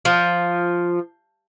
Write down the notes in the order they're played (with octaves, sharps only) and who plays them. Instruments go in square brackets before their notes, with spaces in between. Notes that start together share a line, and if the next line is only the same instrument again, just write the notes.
[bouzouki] F3